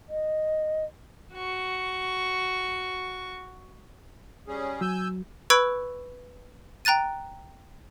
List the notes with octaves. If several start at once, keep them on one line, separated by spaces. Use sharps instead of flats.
D#5
F#4 C#6
G3 C#4 G#4
F#3 G#5 E6 G6
B4 B5 C#6 E6 G#6 D7
G5 A#5 F#6 A6 D#7